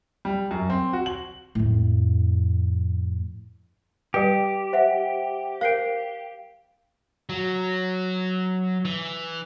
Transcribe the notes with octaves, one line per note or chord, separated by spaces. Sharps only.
G3
F#2
C4
F#4
F#7
F2 A2
G3 G4 B4
C5 E5 F#5
A#4 C5 F5 C7 D7
F#3
E3